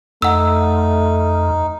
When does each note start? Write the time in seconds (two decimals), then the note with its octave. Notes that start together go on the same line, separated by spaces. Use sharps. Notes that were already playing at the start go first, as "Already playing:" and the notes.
0.22 F2 A3 D#4 F#5 E6